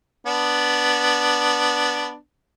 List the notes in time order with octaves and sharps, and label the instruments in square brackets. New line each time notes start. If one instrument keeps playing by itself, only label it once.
[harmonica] B3 D4